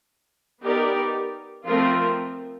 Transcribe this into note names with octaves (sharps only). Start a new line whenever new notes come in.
B3 D#4 G4 A#4 D5
F3 A3 C4 F4 A#4